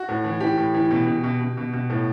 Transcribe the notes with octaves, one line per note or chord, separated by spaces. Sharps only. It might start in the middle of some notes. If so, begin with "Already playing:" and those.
Already playing: F#4
A2
E3
E3 G4
A2
E3
B2
B2
B2
B2
B2
B2
A2